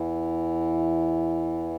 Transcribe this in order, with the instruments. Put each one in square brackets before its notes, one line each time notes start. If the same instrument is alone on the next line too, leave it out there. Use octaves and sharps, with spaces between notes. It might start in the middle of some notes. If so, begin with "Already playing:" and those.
Already playing: [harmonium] E2 E3